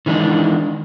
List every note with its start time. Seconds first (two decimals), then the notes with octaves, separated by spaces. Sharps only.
0.06 D#3 E3 G#3 D4